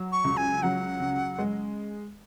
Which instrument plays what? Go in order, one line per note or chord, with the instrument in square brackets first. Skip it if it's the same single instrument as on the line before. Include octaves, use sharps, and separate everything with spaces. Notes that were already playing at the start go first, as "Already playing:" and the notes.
Already playing: [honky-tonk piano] F#3
[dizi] C#6
[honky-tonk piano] C#2
[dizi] G#5
[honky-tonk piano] F#3 [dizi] F#5
[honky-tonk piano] C#3
G#3